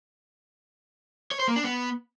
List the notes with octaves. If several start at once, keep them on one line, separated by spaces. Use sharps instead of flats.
C#5
C5
A#3
D4
B3